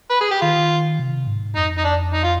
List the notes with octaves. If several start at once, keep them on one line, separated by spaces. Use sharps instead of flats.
B4
G#4
G4
D#3 F4
C3
G#2
F2 D#4
D#4
D4
D#4
F4